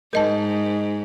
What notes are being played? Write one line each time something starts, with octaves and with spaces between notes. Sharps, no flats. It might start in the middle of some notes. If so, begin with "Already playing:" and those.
G#2 A#4 D#5 A5